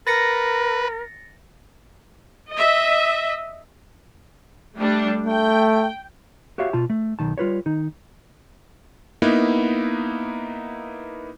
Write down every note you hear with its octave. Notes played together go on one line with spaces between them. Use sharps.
A#4 B4 A6 A#6 C#7
D#5 E5
G3 A3 D4
A3 G5
F#4 G4 C#5 E5 F5
B2 F4 A5
A3
B1 D#3 A5
G3 F4 B4 C#5
D#3 D#4
A#3 B3 D#4 E4 B4